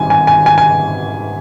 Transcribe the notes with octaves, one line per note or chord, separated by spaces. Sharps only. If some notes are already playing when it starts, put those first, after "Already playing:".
Already playing: G#1 G2 G#5
G#5
G#5
G#5
G#5